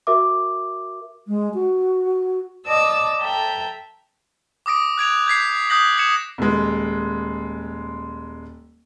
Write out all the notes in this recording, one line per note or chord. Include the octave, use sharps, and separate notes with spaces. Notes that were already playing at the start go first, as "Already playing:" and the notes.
F#4 A#4 E5 D6
G#3
F#4
D5 D#5 A5 D6 E6
A4 E5 G5 A#5
D6 D#6 A#6 D7
F#6 G#6 D7 F7
G6 G#6 B6 C7
D#6 F#6 G6 A#6 F#7
G#6 A#6 C#7 E7
D#1 G#3